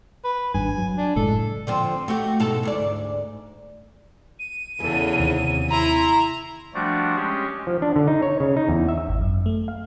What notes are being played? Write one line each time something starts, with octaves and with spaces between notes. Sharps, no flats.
B4
G#1 G2 G#5
F#3
D4
F#1 A2 G#3 A4
D3 F3 C4
A3 F#4 G4
G#2 B2 A4
D2 G#2 D5
D#7
E2 C#3 G#4 A4
D#2 C3
E4 A#5 C6
F3 G3 A3 D4 F#4
G#3 C#4 G4
F3
D4
D3
D#4
C#5
C#3
D#4
E2
E5
G#1
F#2
A3
F5